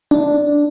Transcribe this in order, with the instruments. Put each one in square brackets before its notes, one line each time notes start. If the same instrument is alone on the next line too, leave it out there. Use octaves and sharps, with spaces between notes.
[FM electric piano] D4